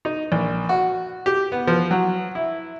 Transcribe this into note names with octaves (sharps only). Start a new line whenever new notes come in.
D#4
A#1
F#4
G4
B3
F3
F#3
E4